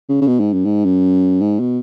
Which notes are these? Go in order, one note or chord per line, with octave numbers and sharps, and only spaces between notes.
C#3
C#3
B2
G#2
F#2
G#2
F#2
G#2
B2